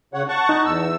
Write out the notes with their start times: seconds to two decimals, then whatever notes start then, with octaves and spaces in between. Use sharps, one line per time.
0.14 C#3 C#5 F#5
0.28 F#5 A5 C#6
0.49 D#4
0.65 E2 E6